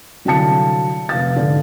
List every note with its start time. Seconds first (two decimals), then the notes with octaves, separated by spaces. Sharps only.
0.25 C2 D3 F#3 F5 A5 C#7
1.09 F1 F5 A6
1.36 G#2 D3